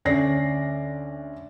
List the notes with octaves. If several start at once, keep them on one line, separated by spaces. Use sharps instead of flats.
D2 C#4 D5 A#6 C7